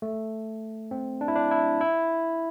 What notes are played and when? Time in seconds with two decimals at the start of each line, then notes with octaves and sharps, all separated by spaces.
0.02 A3
0.91 C4
1.21 D4
1.28 E4
1.36 D4
1.51 E4
1.81 E4